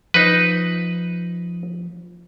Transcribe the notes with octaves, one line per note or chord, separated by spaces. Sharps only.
F3 D#4 B4